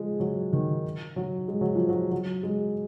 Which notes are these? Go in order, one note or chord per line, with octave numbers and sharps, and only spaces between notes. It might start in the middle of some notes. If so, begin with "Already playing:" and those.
Already playing: F3 G#3
F#3
D#3
F#3
G#3
F#3
F3
F#3
F#3
G#3